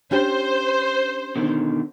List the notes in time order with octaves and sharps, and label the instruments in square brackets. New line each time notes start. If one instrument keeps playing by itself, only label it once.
[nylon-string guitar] C#4 D4 G4 [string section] C5
[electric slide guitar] B2 D3 D#3